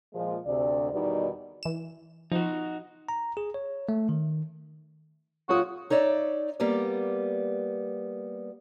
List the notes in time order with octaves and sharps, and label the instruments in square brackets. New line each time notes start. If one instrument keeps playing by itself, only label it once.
[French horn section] A#2 F3 G#3
D2 C3 D5
E2 B2 D#3 G3 D#4 D5
[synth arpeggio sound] E3 E7
[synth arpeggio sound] F3 [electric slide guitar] D#4 F#4
[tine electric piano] A#5
G#4
C#5
A3
D#3
[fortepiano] F#3 C#5 D#6 [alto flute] F4 [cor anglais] F#4
[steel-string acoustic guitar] D#4 C#5 D5 E5
G3 A#3 B3 D5